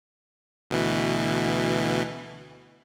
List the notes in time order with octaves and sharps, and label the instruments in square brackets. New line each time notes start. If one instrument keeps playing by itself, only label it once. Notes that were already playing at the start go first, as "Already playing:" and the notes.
[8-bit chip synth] D2 B2 E3